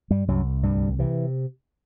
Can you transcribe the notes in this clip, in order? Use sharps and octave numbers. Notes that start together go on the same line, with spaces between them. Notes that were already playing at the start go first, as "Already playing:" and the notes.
G2 G3
C2 F#2 F#3
D2 G2 G3
C3 E3